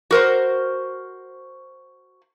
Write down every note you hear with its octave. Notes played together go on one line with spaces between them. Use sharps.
F#4 A#4 C5